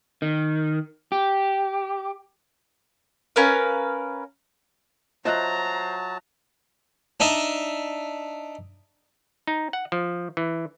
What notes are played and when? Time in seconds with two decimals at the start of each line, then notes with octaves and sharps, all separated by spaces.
0.22 D#3
1.12 G4
3.36 C#4 A#4 B4 F5
5.25 F#3 F4 C5 D#5 E5 A5 A#5 F#6
7.20 D4 D#4 E5
9.47 D#4
9.73 F#5
9.92 F3
10.37 E3